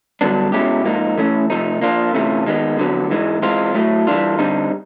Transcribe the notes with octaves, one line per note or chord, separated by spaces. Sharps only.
G2 D3 F#3 B3 D4
B2 G#3 C#4 E4 G4
G#2 F3 A#3 D#4
E3 A3 C#4
C3 F3 A3 C4 D#4
F3 A#3 D4 F4
C3 E3 A3 C#4 F4
D#3 G#3 B3
F2 D3 F#3 B3
G#2 E3 G#3
E3 G#3 C4 F4
A2 F#3 A3
E3 G3 B3 D4 F4
G2 D3 G3 C4 D#4